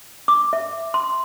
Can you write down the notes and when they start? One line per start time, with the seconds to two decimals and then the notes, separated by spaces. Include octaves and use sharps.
0.28 D6
0.53 E5
0.94 C6